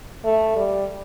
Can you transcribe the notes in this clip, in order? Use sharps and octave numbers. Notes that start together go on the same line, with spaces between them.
A3
G3